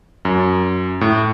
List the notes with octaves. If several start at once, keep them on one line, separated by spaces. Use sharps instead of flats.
F#2
A2